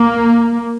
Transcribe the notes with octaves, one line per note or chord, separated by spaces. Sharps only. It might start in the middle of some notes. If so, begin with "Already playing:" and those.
Already playing: A#3